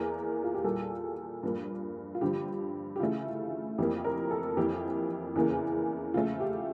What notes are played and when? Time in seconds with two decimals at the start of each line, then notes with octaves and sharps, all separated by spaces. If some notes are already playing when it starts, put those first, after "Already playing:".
Already playing: E2 E3 A#3 A#4
0.44 F4
0.54 G4
0.64 A#2 G3 A#3 A4
1.43 G2 F3 A#3
2.15 F4
2.21 G2 D3 F3 G4
2.96 G4
3.00 C#3 E3 A3 F4
3.78 F2 E3 A#3 G4
4.04 A#4
4.31 A4
4.57 F2 E3 A#3 G4
5.36 E2 C#3 E3 A#3
6.14 C#3 F3 A3 F4
6.40 G4